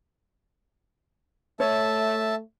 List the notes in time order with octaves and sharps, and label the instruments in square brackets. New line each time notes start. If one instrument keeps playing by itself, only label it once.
[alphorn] A3 [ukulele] C#5 [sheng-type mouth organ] E5 A5